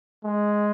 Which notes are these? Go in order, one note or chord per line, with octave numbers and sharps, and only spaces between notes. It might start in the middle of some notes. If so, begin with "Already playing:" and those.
G#3